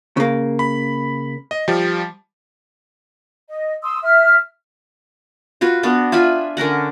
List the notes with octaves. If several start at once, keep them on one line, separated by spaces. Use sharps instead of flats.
C#3 A#3
B5
D#5
F3 G3
D#5
C6 D#6 E6
E5 F6
F4 F#4 B4
B3 D4 F#4
F4 E5 G#5 B5
D3 C#4 A#4 F#5